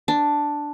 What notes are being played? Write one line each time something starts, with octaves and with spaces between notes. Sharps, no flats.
D4